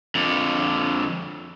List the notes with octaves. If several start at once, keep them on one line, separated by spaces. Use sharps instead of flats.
F2 D3